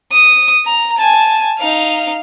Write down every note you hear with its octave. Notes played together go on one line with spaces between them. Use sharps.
D#6
A#5
G#5 A5
D#4 F5